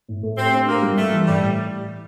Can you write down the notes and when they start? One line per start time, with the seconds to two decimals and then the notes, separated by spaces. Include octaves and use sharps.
0.08 A2
0.23 A3
0.37 C4 G4
0.53 D4
0.67 A#3 G4
0.82 G3
0.97 G3 A3
1.12 E3
1.27 A2 G3